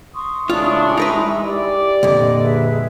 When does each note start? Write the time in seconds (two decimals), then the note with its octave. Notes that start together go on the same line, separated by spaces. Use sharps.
0.15 C6 C#6 D#6
0.50 A1 C#3 G#3 D4 E4 F4
0.97 D#4 A#4 B4
1.43 G4 D5
2.03 C2 F2 A#2 D3 D#5
2.43 G#4 B4 E5